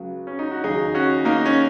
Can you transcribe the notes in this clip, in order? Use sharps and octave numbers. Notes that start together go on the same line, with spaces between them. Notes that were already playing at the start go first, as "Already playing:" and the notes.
Already playing: C#2 C#3 F#3
C#4
D#4
F#4
D#2 C#3 F#3 D#4 G#4
C#4 F#4
A#3 D#4
C#4